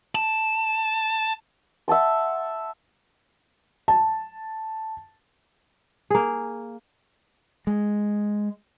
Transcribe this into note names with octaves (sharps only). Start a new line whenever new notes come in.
A5
E5 F#5 A5 C6
A5
A#3 G#4
G#3